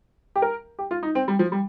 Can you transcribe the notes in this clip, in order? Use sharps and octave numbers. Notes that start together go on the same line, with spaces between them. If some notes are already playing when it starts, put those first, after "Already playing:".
G4
A#4
G4
F4
D#4
C4
G3
F3
G3